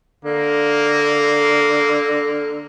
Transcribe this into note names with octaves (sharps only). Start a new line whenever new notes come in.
D3 A#3